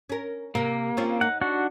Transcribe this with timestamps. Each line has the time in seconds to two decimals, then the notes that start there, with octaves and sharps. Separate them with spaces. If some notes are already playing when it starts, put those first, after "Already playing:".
0.10 C#4 A#4
0.55 C3 A#3 A#4
0.97 C4 C#4 F4
1.21 D#4 F#5
1.42 D4 F#4 F#5